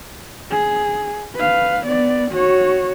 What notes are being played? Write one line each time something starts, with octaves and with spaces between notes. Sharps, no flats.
G#4
B4 F5
B3 D5
F#4 C#5